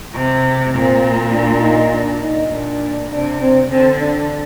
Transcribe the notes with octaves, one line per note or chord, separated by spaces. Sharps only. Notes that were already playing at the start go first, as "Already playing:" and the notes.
C3
A#2 C4
D4
D#4
D4
D#4
A#2 D4
C3 D4
C4
D3 C4
D4